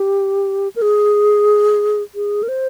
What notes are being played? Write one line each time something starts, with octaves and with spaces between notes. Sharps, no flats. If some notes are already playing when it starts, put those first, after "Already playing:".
Already playing: G4
A#4
G#4
G#4
A#4
C5